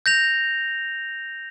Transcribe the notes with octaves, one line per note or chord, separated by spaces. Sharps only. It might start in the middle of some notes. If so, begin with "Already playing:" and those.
G6 A#6 F7